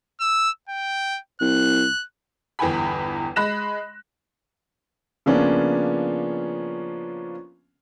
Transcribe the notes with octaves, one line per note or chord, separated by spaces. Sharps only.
E6
G5
C2 F#6
G1 E2 G5 G#5 B5
G#3 B5 F#6 A#6 E7
C#3 F3 A#3 B3 C#4 D4